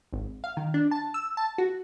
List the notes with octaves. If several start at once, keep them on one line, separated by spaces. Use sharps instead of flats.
G#1
F5
D#3
D4
A5
E6
A5
F#4